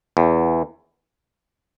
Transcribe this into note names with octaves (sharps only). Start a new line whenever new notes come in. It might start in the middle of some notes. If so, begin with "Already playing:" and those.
E2